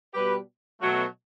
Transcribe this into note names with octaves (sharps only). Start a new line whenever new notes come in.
B2 G3 G4 B4
B2 F#3 A3